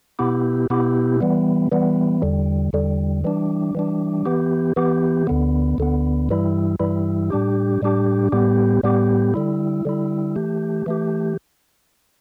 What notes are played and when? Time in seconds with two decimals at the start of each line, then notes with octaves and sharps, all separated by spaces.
0.19 B2 B3 E4 G4
0.70 B2 B3 E4 G4
1.21 E3 G3 B3
1.72 E3 G3 B3
2.22 E2 D3 G3
2.73 E2 D3 G3
3.24 E3 G3 D4
3.75 E3 G3 D4
4.26 E3 B3 G4
4.76 E3 B3 G4
5.27 D2 D3 B3
5.78 D2 D3 B3
6.29 G2 E3 G3 E4
6.79 G2 E3 G3 E4
7.30 A2 G3 D4 G4
7.82 A2 G3 D4 G4
8.32 A2 G3 B3 G4
8.83 A2 G3 B3 G4
9.34 D3 G3 E4
9.85 D3 G3 E4
10.36 E3 A3 G4
10.86 E3 A3 G4